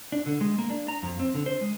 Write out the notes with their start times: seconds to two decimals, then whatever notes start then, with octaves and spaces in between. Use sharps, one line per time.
0.12 D4
0.26 D3
0.41 G#3
0.58 A#3
0.70 D4
0.88 A#5
1.03 F2
1.19 C4
1.34 D3
1.46 C5
1.61 G#3